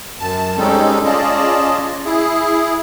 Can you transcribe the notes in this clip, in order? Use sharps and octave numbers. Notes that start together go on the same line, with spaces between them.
F#2 A5
G3 G#3 C4 C#4 D#4 A4
C#4 F4 G#4 D5 D#5 A5
E4 G#4